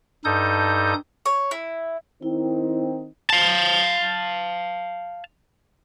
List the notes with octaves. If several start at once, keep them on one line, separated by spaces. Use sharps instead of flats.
G2 D#4 A4 D#6 G6
C#5
E4
D#3 C4 D#4 E4
F5 A5